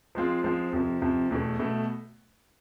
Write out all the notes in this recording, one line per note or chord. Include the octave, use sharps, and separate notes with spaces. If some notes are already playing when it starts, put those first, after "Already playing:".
F3 G#3 C4 F4
F3 G#3 C4 F4
F2 C3 F3
F2 C3 F3
E2 B2 A3
B2 A3